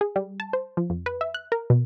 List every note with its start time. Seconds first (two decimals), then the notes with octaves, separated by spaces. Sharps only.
0.01 G#4
0.16 G3
0.40 A5
0.53 C5
0.77 F3
0.90 F2
1.06 B4
1.21 E5
1.34 F#6
1.52 A#4
1.70 B2